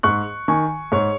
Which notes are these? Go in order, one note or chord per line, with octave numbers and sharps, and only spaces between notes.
G#2 C#6 F#6
D#3 G#5 C#6
G#2 C#5